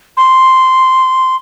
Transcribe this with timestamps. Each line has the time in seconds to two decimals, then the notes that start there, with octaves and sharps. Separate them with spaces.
0.17 C6